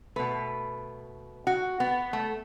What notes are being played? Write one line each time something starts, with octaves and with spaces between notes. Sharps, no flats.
B2 A3 B4
F#4
B3
A3